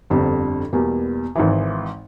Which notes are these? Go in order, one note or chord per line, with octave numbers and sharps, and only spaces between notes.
G1 F2 D3 G3 C4
E2 B2 G3 A#3
G#1 G#2 E3